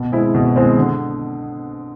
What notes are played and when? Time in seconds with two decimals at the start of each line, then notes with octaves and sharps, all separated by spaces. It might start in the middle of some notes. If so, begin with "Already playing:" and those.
Already playing: B2
0.12 G#3 C4 E4
0.35 B2
0.56 G#3 C4 E4
0.77 D3